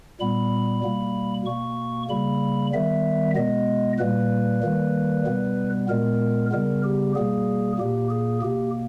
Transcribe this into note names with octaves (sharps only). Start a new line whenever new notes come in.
A#2 G3 B3 B5
B2 G3 A#3
B2 A#3 C#6
C#3 G3 A#3 B5
D#3 G3 B3 E5
B2 G#3 B3 D#5
A#2 G3 A#3 B4
D#3 G3 A#3
B2 G3 B3
A#2 G#3 B3 A#4
C#3 G3 B3 A#4
G4
B2 G3 A#3 G#4
A#2 A#3 G4
G#4
B2 A#3 G4